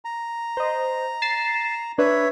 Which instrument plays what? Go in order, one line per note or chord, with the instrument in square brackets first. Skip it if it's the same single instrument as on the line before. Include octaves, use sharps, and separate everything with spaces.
[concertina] A#5
[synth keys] C5 D#5
A6 C7 E7
[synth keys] D4 B4 [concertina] C#5 E5